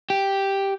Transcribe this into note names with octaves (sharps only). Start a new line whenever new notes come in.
G4